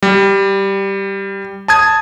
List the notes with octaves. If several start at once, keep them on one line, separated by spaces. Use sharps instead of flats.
G3
A5 D#6 G#6